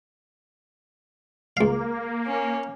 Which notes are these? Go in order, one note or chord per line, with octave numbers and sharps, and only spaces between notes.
C#2 A#3 F5
C#4